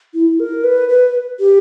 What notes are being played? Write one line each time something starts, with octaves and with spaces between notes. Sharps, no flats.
E4
A#4
B4
B4
G4